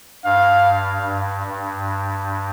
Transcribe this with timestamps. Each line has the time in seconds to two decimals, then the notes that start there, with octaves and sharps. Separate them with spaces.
0.25 G2 F5
1.06 G2
1.47 G2